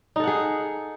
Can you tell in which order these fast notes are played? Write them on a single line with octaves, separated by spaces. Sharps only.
D#4 A4 F#5 G#4